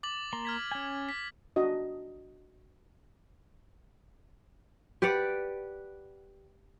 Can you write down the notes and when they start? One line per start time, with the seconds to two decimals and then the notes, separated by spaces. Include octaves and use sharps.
0.03 D6 A6 F#7
0.33 A#3 A#5 C6
0.45 F6 G#6 B6
0.71 C#4 G#5
1.09 B6
1.56 D4 F#4 D#5
5.02 G4 B4 D5 F#5